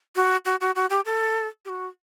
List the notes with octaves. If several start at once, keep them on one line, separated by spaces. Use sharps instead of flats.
F#4
F#4
F#4
F#4
G4
A4
G4
F#4